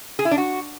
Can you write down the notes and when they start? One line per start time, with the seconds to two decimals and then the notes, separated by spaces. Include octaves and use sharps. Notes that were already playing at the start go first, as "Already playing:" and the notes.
0.19 G#4
0.25 E4
0.31 D4
0.38 F#4